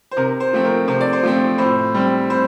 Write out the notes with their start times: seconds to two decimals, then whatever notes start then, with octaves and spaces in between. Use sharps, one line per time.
0.11 C5
0.17 C3 A#4
0.40 C5
0.53 F3 A3 C4
0.64 A#4
0.88 C3 C5
1.01 D5
1.13 C5
1.23 F3 A3 C4
1.58 A2 C5
1.94 G3 C4
2.30 A2 C5